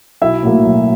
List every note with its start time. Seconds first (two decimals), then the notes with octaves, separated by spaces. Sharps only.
0.22 B1 E4 E5
0.43 A2 F#3 A#3
0.65 B1